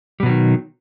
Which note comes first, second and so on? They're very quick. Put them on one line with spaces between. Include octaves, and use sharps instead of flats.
G3 B2 F#3 D#3